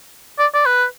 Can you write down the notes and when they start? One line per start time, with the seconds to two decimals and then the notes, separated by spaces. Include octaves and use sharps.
0.39 D5
0.54 D5
0.66 B4